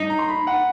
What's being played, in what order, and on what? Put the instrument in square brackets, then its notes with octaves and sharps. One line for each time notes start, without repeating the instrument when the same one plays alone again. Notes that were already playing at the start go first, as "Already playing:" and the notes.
Already playing: [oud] D#4
[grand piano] A#5
C6
B5
F#5